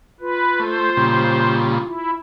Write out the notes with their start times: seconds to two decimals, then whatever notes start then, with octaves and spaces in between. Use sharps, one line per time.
0.20 F4 B4
0.60 A3 C5
0.97 A#2 C#3 G3
1.85 E4